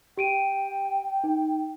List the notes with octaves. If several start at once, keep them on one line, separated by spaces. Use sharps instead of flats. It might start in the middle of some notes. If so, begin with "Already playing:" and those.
G4 G5 D7 D#7
D#4